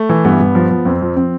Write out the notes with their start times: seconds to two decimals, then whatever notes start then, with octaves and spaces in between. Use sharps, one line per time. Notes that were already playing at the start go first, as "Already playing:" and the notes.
Already playing: A3
0.09 E3
0.25 G2 B3
0.40 G2
0.55 F3
0.71 F3
0.85 F2 C4
1.02 F3
1.16 C4